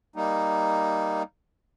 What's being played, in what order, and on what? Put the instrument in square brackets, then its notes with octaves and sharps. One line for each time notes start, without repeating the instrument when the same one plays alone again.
[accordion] G3 A#3 D#4